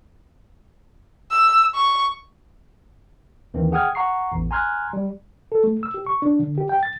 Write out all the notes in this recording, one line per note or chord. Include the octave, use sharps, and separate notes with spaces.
E6
C#6
D#2 D#3 E3 C4
G#4 F#5 G5 D#6 F6 G#6
F#5 A#5 C#6 C7
A1 E2
G#5 A#5 C6 F6 F#6 G#6
G3
A4
A3
E6
G4
C#6
D4
D3
G4
G5
A6